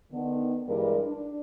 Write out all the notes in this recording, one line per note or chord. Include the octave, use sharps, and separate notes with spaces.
D3 D#3 B3
G2 E3 G3 G#3 A#4
D4